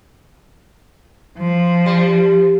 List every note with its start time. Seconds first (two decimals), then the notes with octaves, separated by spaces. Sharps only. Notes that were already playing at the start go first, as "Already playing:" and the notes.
1.38 F3
1.86 G3